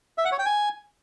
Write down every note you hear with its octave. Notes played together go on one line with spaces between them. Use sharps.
E5
F#5
C#5
G5
G#5